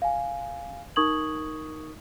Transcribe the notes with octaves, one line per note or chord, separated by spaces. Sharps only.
F5 G#5
D#4 A#4 C#6 D#6 G#6 F#7